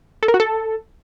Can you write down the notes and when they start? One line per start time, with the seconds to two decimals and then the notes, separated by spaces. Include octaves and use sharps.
0.23 A4
0.28 A#4
0.34 F#4
0.40 A4